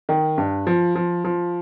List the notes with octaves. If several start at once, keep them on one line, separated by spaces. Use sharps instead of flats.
D#3
G2
F3
F3
F3